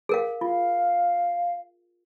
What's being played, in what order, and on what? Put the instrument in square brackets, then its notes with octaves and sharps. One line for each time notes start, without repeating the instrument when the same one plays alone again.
[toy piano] G#4 A#4 F5
[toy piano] F4 [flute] F5